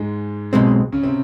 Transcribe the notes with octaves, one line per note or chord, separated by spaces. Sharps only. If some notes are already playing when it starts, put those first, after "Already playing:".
Already playing: G#2 G#3
B1 B2 G#3 C4
C#3 C#4
C3 C4